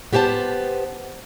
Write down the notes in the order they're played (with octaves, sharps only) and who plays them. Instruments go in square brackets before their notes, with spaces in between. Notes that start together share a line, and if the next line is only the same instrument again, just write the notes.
[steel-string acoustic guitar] B3 G4 C5 G#5 A5